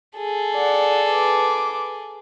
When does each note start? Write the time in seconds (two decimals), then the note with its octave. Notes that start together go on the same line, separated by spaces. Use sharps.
0.17 G#4 A4
0.55 D5 F#5
1.10 B4 D6